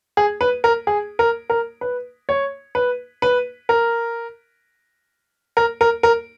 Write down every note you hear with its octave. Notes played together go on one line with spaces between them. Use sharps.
G#4
B4
A#4
G#4
A#4
A#4
B4
C#5
B4
B4
A#4
A#4
A#4
A#4